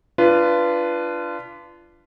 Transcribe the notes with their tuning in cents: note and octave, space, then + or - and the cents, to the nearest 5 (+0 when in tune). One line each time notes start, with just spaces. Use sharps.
D4 +0 F4 -25 B4 +0